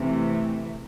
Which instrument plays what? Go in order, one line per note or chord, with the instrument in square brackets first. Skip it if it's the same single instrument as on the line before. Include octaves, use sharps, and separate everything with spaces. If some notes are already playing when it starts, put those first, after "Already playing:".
Already playing: [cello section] C3 E3 A3